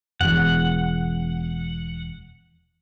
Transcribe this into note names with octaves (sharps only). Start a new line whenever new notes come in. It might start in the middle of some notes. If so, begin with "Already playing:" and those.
E1 E2 F#5